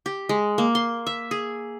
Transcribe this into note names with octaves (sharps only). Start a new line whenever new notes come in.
G4
G#3
A#3
C6
E5
G#4